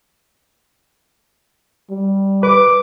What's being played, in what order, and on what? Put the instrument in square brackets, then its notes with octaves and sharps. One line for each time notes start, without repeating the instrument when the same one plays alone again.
[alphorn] G3
[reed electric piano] B4 [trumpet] D6